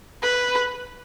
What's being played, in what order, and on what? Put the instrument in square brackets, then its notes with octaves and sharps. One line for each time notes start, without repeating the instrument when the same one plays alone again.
[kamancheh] B4